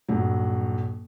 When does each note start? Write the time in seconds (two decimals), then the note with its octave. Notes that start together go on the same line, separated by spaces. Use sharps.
0.09 D#1 G2 F#3